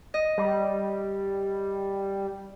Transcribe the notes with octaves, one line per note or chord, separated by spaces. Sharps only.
D#5
G3